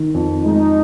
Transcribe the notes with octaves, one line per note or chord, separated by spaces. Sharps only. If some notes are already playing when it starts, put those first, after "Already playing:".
Already playing: D#3
F2
G#3 D#4